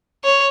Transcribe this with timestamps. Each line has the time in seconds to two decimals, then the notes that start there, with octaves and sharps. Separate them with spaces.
0.24 C#5